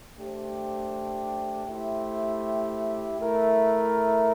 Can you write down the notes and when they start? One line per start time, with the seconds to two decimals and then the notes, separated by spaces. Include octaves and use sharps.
0.17 A3 D4 G4 C5
1.68 A3 E4 G4 C5
3.18 A3 E4 A#4